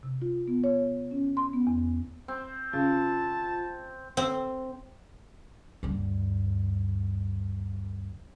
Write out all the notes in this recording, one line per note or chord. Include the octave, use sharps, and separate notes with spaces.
C3
F4
B3
C#5
C#4
C6
B3
E2
C4
C#3 F4 A5
C4
D2 G2